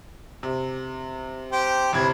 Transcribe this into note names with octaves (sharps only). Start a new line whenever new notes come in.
C3
G4 C5
G1 C3 E3 G#6